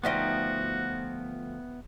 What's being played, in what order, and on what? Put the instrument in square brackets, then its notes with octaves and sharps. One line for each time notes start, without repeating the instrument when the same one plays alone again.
[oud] D2 F3 D#4 [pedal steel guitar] B3 E5 G5 [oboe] F#4